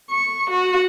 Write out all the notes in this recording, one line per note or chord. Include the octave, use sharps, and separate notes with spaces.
C#6
F#4